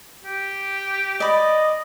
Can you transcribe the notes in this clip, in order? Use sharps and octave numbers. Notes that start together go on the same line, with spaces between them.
G4
D5 D#5 B5